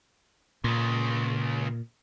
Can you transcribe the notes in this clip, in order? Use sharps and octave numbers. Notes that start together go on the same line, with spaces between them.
C#2 A#2 C#3